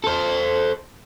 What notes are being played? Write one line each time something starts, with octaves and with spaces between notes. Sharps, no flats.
A4 C5